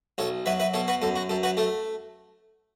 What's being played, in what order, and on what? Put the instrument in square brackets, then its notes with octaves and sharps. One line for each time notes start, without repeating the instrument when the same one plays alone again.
[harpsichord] B1 A4 C#5
F#3 B4 E5
B4 E5
B2 A4 C#5
F#4 B4
F#2 A4
F#4
F#2 A4
F#4 B4
A3 A4